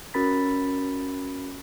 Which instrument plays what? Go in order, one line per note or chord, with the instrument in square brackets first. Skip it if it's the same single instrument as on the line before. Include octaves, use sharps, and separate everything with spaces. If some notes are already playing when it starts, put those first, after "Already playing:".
[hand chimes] C#4 F#4 A#4 B5 A6 B6